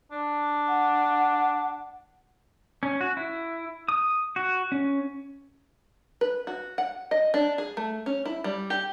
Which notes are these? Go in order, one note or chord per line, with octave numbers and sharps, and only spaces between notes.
D4
F#5
C#4
F#4
E4
D#6
F#4
C#4
B4
F#4
F#5
D#5
D4
G#4
A3
C#4
E4
G3
G4